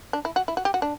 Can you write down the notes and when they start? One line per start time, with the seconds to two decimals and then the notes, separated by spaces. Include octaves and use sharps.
0.13 D4
0.25 E4
0.36 F#4
0.48 E4
0.57 F#4
0.65 G4
0.74 F#4
0.82 D4